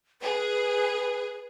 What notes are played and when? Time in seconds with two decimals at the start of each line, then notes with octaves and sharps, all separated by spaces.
0.22 G#4 B4